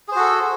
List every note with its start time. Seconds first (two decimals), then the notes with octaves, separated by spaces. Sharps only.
0.08 G#4
0.12 C5
0.16 F#4
0.19 A4